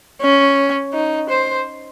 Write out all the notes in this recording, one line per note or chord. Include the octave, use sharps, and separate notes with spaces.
C#4
D#4
C5